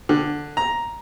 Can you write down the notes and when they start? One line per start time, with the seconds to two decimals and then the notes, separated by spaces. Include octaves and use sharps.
0.09 D3
0.57 A#5